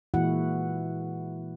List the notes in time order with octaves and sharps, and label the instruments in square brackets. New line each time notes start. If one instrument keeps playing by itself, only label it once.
[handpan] A#2 E3 G#3 E4 F#4 F#5